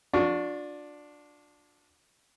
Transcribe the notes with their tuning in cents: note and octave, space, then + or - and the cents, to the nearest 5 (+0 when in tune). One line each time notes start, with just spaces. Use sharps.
D4 +0 F4 +45 C#6 +0